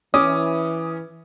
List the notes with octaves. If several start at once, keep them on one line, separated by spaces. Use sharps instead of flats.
E3 C#4 D6 D#6